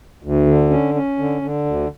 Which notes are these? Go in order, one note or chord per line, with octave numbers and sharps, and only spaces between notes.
D2
D3
C#4
C#4
D3
D3
D2